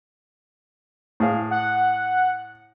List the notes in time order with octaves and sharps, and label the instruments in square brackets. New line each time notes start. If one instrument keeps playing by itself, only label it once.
[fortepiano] A2 G#4 F5
[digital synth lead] F#5